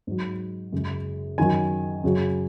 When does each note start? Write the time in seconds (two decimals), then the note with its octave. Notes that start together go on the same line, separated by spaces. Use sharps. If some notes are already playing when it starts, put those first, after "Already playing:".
0.07 G#2 F#3
0.72 F#2 C#3 G#3
1.38 F#2 D#3 F#3 G#5
2.04 F#2 C#3 F#3